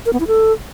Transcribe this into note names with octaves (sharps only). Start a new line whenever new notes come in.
A#4
B3
E4
A4